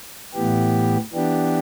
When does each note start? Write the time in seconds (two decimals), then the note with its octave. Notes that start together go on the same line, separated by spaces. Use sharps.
0.34 A2 E3 B3 G4
1.13 E3 B3 D4 G4